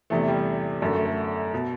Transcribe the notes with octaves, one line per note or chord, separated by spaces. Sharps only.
E2 C3 E3 A3
G3
F#2 D3 A3
A3
A3
B2